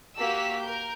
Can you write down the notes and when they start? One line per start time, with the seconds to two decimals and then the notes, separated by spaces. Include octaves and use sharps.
0.18 A#3 F#4 G4 E6 B6
0.61 A#4 G6